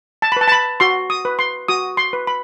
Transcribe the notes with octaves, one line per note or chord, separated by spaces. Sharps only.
A5
B5
B4 A5
A5
B5
F#4 C6
D#6
B4
C6
F#4 D#6
C6
B4
B5